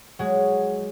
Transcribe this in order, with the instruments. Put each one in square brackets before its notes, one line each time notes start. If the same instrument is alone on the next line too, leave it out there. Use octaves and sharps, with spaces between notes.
[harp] F#3 G#3